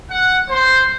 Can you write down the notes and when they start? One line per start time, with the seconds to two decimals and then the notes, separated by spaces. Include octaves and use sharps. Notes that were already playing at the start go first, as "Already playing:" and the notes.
0.11 F#5
0.50 C5